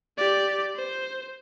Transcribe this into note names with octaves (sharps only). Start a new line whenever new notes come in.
G4 D5
C5